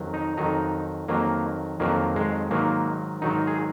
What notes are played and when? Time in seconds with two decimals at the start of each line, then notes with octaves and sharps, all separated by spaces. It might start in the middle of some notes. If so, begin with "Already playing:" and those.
Already playing: F2 D#3 F#3
0.14 D#4
0.37 F2 D#3 F#3 D#4
1.08 F2 D#3 F#3 A#3
1.80 F2 D#3 F#3 A#3
2.16 G#3
2.51 G#2 D#3 F#3 A#3
3.22 G#2 D#3 F#3 D#4
3.47 G#4